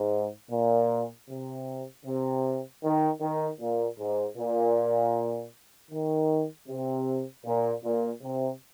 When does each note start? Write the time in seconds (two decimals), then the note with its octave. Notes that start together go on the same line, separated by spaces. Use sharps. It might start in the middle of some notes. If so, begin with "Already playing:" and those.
Already playing: G#2
0.51 A#2
1.29 C3
2.05 C3
2.83 D#3
3.21 D#3
3.60 A#2
3.99 G#2
4.37 A#2
5.91 D#3
6.68 C3
7.45 A#2
7.84 A#2
8.22 C3